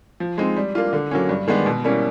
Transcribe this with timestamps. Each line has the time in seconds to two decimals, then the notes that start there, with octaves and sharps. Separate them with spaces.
0.20 F3
0.38 G#3 C4 D#4
0.56 G3
0.75 A#3 D4 F4
0.93 D3
1.11 F#3 A#3 C#4
1.29 G2
1.48 D#3 G#3 B3 D4
1.66 B2
1.84 G3 A#3 C#4 E4